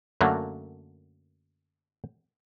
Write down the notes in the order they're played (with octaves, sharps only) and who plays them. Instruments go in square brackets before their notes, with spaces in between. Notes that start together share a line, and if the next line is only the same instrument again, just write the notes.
[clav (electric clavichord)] F#2 D3 F#3 A3 A#3